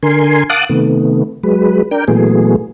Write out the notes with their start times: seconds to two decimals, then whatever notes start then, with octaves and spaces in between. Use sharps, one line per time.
0.03 D3 A#4 G#5 C6
0.50 F5 F#5 A5 D6 D#6 F#6
0.69 C3 D#3 A3 B3
1.43 F#3 G#3 B4
1.91 D4 A#4 G5
2.08 A#2 E3 F#3 A3 B3 G#4